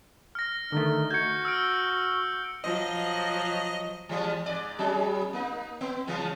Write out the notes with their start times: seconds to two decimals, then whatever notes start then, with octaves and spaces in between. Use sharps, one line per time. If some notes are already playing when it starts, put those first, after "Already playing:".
0.35 F6 A#6
0.72 D3 D#3 A3 D#4
1.11 F#4 G6 G#6 C#7
1.45 E6 F6 D7
2.64 F3 F#3 D#5
4.09 E3 G3 G#3
4.46 G#2 D5
4.79 F#3 C#4 G#4
5.33 A#3 D#4
5.81 B3
6.07 C#3 E3 G#3